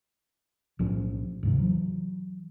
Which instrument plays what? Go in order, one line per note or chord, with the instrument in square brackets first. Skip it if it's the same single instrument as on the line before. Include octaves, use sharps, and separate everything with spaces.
[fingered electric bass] B1 A2 F3 C#4
D#2 G#2 C3
E3 F#3